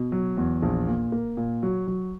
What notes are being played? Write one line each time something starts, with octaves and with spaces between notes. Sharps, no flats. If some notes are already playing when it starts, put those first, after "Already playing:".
Already playing: B2
F#3
E2
A#1
A#2
A#3
A#2
F#3
F#3